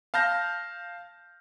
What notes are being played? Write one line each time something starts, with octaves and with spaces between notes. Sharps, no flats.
F5 A5 F6 G6 A#6